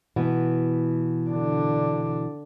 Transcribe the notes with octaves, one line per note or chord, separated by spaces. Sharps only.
B2 E3
D3 D4